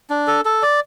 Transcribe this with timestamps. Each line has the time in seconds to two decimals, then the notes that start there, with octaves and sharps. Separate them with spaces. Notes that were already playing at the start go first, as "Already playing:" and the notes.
0.10 D4
0.27 A4
0.45 A4
0.62 D5